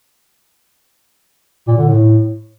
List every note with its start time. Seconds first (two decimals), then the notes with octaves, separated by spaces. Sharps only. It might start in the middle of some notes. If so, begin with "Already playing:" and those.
1.68 A#2
1.78 D3
1.88 A2